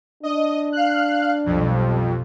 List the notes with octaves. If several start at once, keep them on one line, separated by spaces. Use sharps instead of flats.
D4 D#5
F5 F#6
B1 F2 G3